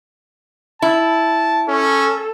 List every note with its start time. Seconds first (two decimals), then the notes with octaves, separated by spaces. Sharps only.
0.82 E4 A5
1.68 C#4 A4